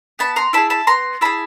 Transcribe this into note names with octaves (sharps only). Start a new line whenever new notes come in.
B3 A5 B5
A#5 C6
E4 G#4 A5 B5
A5 B5
B3 A#5 C6
E4 G#4 A5 B5